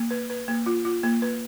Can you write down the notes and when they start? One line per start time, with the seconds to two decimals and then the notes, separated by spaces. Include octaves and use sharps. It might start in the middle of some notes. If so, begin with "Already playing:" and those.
Already playing: A#3
0.11 B4
0.30 B4
0.48 A#3
0.66 F4
0.85 F4
1.03 A#3
1.22 B4